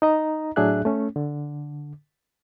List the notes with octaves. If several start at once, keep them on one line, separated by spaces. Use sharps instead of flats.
D#4 D#5 A#5
A2 F#3 D4 G#4 E5 F#6
A3 C#4
D3